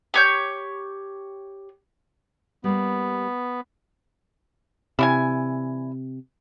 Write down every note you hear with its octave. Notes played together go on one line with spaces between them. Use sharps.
G4 C#5 G6
G3 A#3 B3
C3 E3 G3 G#5